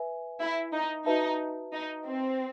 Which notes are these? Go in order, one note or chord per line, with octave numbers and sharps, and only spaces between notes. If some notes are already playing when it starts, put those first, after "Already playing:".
Already playing: B4 E5 G#5
E4
D#4
D#4 F#4 B4 E5 A5
D#4
C4